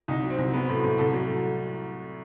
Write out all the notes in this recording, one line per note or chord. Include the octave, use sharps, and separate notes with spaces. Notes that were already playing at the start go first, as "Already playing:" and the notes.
C2 D#4
F#3
C4
C2
F#3 B3
A2
A2
C2 A4
F#3